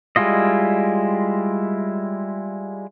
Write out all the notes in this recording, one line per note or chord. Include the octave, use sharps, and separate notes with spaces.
G3 G#3 E4 F4 D#5